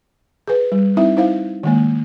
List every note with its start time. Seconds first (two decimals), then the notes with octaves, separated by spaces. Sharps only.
0.48 G#4 B4
0.72 G3
0.97 C4 D#4 E4 E5
1.17 D#4 E4 C5 F5
1.63 D#3 G#3 A#3